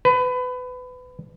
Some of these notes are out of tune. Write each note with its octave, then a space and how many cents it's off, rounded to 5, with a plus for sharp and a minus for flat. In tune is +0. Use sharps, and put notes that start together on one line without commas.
B4 +25